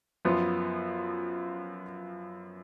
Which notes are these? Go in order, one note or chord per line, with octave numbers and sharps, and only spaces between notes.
F#2 F3 B3 F4